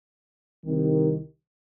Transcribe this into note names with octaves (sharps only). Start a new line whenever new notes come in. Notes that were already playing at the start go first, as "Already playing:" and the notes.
C2 C3 D#3